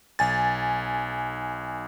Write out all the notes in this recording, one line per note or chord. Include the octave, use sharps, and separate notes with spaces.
B1 G#5 A6